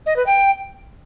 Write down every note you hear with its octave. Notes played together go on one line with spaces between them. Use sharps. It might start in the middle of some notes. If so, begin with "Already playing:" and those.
D#5
B4
G5